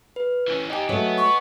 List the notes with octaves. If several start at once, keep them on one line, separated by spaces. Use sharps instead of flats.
B4
E3 C#4
D#4 G4 D#5 G#5
F#3 A3 B3
C#6